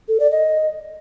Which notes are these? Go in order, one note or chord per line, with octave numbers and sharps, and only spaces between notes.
A4
D5
D#5